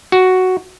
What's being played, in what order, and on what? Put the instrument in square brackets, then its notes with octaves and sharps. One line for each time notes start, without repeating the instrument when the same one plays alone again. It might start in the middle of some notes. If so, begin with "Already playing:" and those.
[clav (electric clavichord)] F#4